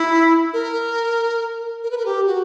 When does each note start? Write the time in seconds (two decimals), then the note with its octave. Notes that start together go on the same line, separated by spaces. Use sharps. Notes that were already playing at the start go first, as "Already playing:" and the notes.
Already playing: E4
0.53 A#4
1.84 A#4
1.91 B4
1.98 A#4
2.06 G4
2.27 F#4